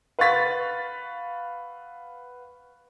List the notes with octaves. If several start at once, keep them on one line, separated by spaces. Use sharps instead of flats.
B4 F5 F#5 C#6 A6 B6